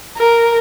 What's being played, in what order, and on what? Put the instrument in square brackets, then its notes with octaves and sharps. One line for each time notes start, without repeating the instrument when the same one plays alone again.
[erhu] A#4